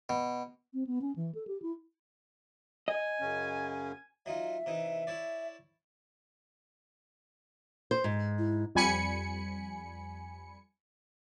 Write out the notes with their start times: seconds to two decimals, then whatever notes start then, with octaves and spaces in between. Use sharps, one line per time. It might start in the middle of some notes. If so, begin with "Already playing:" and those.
0.09 B2
0.74 C4
0.87 B3
1.02 C#4
1.16 E3
1.35 A4
1.47 G4
1.62 E4
2.88 D#5 G#5
3.21 F#2 C#3 C#4
4.26 F#3 D#4 F4 E5
4.66 C3 E3 D#4
5.07 E4 C#5 D5
7.91 C5
8.04 G#2
8.39 E4
8.75 F2 G3 G#5 B5 C#7